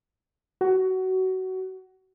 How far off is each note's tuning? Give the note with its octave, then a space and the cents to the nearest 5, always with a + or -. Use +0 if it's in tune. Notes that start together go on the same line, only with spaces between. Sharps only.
F#4 +20